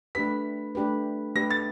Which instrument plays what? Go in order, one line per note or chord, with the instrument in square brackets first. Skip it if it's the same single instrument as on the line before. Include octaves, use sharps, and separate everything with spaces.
[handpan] A3 D4 G4 B4 [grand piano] B6
[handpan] A3 D4 G4 B4
[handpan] A3 D4 G4 B4 [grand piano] A#6
[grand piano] A6